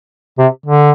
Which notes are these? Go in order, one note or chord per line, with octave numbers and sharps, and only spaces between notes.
C3
D3